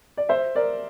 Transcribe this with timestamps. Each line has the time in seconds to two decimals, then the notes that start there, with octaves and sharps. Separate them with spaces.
0.17 D5
0.29 C5 E5
0.55 A#4 D5